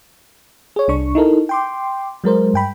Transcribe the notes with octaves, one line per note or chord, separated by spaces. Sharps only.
G#4 C#5
C2 D4 C#6
D#4 E4 A4 A#4
G5 C6 D6
F#3 G#3 A#4 C5
G2 G5 B5